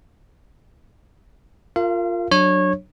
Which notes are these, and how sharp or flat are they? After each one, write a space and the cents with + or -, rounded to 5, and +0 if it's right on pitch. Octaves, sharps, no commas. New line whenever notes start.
F4 +0 A#4 -25 F5 -35
F#3 +0 D4 +10 C#5 -20